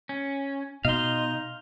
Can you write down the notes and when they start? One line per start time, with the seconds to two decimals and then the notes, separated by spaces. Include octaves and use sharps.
0.09 C#4
0.85 B2 D#4 D#5 F5 C6